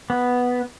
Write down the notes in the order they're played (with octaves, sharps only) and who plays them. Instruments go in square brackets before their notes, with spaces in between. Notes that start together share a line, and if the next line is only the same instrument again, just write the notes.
[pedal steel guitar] B3